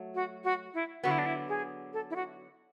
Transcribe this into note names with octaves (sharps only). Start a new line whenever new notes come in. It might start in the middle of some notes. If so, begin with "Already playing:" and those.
Already playing: F#3 A3
F#4
F#4
E4
D3 F#3 B3 F#4
E4
D4
E4
G#4
A4
E4
F#4